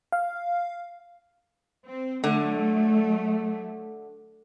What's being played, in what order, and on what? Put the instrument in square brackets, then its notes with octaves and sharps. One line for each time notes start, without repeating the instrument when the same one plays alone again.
[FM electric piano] F5
[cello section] C4
[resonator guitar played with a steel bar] D3 [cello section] F#3 A3